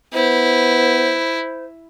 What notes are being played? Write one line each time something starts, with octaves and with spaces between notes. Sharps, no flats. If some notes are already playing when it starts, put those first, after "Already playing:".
B3 E4 C5